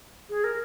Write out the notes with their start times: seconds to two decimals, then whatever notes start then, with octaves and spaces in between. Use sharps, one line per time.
0.30 G#4
0.44 A#4